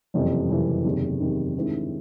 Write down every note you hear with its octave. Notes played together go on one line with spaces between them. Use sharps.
F#1 F2 C3 E3 G3
F#1 F2 C3 E3 G3
F#1 E2 C3 D#3
F#1 E2 C3 D#3
G2 D#3 G#3 C4 E4